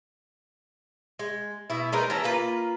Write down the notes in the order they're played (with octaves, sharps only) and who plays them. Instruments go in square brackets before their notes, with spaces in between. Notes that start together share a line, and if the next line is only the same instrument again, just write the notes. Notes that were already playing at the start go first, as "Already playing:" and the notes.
[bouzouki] G#3
B2 E4
G#3 D#4 A#4 B4
E3 C#4 A5 A#5
A#3 F4 B4